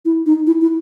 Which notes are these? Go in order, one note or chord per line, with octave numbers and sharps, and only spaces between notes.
E4
D#4
E4
E4